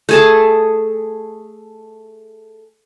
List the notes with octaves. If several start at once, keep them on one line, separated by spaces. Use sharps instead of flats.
A3 G#4 A5